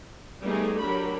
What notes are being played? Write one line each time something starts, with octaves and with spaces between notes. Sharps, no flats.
G3 A3 B3 D#4 G4 G#4
F#3 D4 G4 A#4 B5